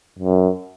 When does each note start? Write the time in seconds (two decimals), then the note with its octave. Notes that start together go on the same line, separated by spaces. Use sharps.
0.19 F#2